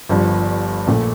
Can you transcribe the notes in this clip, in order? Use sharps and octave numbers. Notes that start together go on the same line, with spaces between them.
G1 G2 F3
A#1 A#2 A3